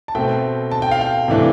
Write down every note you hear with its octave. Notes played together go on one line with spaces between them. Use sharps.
A5
B2 A3 C4 G5
A5
G5
F5
G5
C3 E3 A3 D4